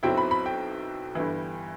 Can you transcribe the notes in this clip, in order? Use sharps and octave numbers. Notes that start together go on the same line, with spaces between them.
B1 B2 F#3 C4 E4 G5
B5
B5
G5
G1 G2 E3